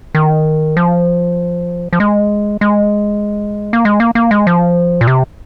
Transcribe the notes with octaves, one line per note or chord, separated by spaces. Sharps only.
D#3
F3
F3
G#3
G#3
A#3
G#3
A#3
A#3
G#3
F3
A#2
C3